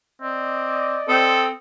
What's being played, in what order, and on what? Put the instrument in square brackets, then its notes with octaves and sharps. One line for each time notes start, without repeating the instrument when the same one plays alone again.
[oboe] C4 [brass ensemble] D5 D#5
[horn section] C4 [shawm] A4 [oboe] D#6